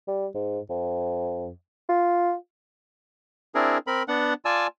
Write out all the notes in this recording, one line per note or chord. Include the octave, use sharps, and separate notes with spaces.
G3
G#2
F2
F4
C4 D4 E4 G#4 A#4
C4 A#4 B5
B3 D4 F#5
F4 D5 G#5 A5 E6